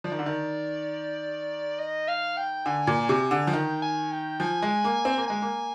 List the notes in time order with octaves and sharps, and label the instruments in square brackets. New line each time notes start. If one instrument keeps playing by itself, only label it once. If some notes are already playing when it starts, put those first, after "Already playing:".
[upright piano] F3 [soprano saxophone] D5
[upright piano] D#3
D3
D#3
[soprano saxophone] D#5
F5
G5
[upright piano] D3 [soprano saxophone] G#5
[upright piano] A#2
[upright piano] C3 [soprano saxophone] G#5
[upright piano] D3
F3
[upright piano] D#3 [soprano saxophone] G5
[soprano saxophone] G#5
G5
[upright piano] F3 [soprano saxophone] G#5
[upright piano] G#3
A#3
C4
A#3
[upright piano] G#3 [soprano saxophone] G#5
[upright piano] A#3